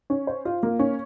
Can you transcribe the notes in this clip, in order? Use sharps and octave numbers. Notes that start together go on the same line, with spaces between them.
C#4
C5
F4
A#3
C#4